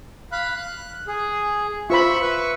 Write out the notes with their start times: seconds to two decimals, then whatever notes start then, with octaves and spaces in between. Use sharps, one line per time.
0.32 F5 B5 F#6
0.56 F#6
1.08 G#4
1.90 F4 C5 E5 B5 C#6
2.22 B4 E5 C#6